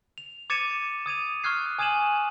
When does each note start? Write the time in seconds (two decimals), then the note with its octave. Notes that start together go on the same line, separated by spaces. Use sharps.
0.18 F7
0.50 D6 G#6 A6 C#7 D#7 E7
1.06 D#6 G#6 D#7 F7
1.44 C#6 D#6 F6 F#6 G#6 C7
1.79 G#5 D#6 G#6 D#7 E7 F#7